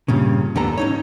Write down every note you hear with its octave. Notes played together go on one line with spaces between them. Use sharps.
G2 A#2 C#3
D#2 G#2 B3 D4 A4 A#5
C#4 D#4 C#5